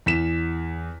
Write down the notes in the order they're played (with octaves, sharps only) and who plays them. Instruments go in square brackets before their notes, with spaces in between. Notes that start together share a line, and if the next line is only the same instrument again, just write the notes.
[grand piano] E2 B6 E7